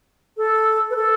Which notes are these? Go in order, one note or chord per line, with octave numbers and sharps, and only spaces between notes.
A4
B4
A4